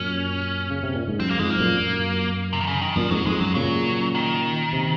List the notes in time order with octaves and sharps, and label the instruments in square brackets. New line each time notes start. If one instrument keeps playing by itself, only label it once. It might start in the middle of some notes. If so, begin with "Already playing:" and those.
Already playing: [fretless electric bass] F#2 A#2 [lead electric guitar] C#4
[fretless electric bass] C#3
C3
A#2
G#2
[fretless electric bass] F#2 [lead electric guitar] C4
[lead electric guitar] A#3
[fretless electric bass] F2 G#2 [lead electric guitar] G#3
[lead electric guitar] A#3
[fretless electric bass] F#2 A#2
F#2
[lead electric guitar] C3
D#3
C#3
D#3
[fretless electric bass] F#2 A#2 [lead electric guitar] F3
[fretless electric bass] F2 G#2 [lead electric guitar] F#3
[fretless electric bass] F2 G#2 [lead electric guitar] G#3
[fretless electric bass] F#2 [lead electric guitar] F#3
[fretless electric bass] A#2 C#3 [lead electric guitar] F#3
[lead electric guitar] D#3
[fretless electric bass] C3